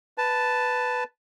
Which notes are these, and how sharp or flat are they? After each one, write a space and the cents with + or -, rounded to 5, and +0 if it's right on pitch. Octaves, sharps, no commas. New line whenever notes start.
B4 +5 A5 +0